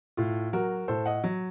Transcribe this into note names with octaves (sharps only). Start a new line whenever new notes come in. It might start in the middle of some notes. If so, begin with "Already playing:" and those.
A2 F4
F#3 F#4 A#4
A2 A4 C5
D#5 F#5
F#3